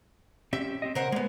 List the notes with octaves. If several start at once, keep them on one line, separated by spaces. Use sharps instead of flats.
C4 C#4 G4 E5
C4 G4 D#5
C#3 A#4 C5 F#5
G#3 A#3 B3